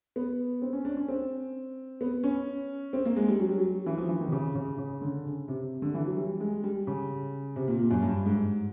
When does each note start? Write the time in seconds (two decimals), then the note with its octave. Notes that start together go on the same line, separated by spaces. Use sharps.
0.16 B3
0.62 C4
0.73 C#4
0.85 D4
0.97 C#4
1.08 C4
2.01 B3
2.24 C#4
2.93 C4
3.05 A#3
3.16 G#3
3.28 G3
3.40 F#3
3.49 G3
3.58 F#3
3.86 E3
3.98 F3
4.08 E3
4.21 D#3
4.27 C3
4.32 C#3
4.55 C#3
4.78 C#3
5.01 D3
5.25 C#3
5.48 C3
5.82 D3
5.94 E3
6.06 F#3
6.17 G3
6.40 G#3
6.64 G3
6.87 C#3
7.56 C3
7.68 A#2
7.79 A#2
7.91 F#2
8.02 G2
8.26 G#2